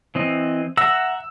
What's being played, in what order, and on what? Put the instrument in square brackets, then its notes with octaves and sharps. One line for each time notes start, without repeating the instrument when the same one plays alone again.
[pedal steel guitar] E3 C4 D#5
[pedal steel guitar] E5 F#5 A#5 [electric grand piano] E6